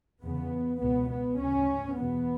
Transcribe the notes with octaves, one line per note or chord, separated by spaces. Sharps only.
E2 C#3 B3
C#2 B2 B3
B3
D2 C#3 C#4
E2 B2 B3